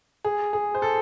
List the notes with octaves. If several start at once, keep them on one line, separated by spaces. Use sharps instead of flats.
G#4
G#4
C5
A4